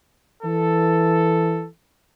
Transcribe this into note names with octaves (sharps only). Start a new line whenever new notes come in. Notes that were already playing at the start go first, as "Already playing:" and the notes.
E3 A4